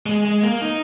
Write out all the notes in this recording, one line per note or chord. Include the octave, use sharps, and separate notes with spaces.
G#3
G#3
A#3
D#4